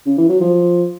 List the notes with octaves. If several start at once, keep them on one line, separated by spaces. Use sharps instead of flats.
C#3
E3
F#3
F3